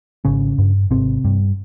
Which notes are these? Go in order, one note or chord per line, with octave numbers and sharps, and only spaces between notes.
G#1 C#3 C#4
G2
G#1 C3 C4
G2